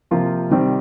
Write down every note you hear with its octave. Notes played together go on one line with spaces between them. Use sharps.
C3 F3 A#3 F4
C3 D#3 G3 C4